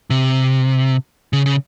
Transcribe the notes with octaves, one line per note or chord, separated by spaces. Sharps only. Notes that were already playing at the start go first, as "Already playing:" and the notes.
C3
C#3
C#3